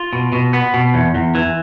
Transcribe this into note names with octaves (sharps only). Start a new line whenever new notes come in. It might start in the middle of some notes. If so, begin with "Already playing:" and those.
Already playing: F4
B2
B2
B3
B2
E2
E2
E3